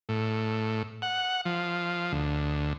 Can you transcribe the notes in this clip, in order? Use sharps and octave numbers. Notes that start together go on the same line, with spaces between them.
A2
F#5
F3
D2